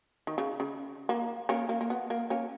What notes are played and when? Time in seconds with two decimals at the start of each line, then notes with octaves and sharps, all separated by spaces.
0.27 D#3
0.38 C#3
0.60 C#3
1.09 A#3
1.49 A#3 C#4
1.69 A#3
1.81 A#3
1.90 B3
2.10 A#3
2.30 A#3 C#4